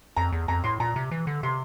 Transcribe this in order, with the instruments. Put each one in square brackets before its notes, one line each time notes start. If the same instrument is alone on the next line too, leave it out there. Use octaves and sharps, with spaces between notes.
[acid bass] F2 [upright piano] A#5
[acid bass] E2
[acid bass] F2 [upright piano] A#5
[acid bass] A2 [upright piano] C6
[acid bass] A#2 [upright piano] A#5
[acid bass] C3
E3
D3
[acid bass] C3 [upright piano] C6